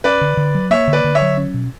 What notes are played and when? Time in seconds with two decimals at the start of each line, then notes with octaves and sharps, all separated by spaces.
0.04 C#4 B4 D5
0.21 D3
0.37 D3
0.54 F#3
0.70 A#3 C#5 E5
0.88 D3
0.93 B4 D5
1.04 D3
1.15 C#5 E5
1.22 F#3
1.37 C#4
1.54 B2